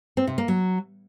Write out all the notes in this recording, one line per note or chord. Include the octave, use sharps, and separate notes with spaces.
C4
C3
A#3
F#3